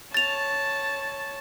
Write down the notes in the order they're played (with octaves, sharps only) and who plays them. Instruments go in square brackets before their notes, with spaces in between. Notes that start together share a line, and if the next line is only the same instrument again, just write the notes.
[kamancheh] C#5 A5 [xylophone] A6 F7